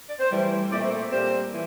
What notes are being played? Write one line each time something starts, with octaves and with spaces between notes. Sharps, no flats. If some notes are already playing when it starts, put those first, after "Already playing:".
D5
C5
A2 E3 G3
A#2 A3 C4 D5
C5
C5
A#2 G3 C4 C5
E3